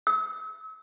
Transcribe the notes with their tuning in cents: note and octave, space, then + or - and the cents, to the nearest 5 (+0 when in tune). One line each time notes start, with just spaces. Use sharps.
E6 -40